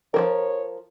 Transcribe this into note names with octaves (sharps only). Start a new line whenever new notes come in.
F3 F#3 A#4 C#5